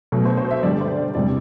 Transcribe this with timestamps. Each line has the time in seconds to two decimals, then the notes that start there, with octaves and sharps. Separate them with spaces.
0.12 B2 F#3 A3
0.25 C5
0.37 C5
0.51 E5
0.63 G2 D3 G3 D5
0.81 C5
0.97 D5
1.15 E2 C3 G3 D5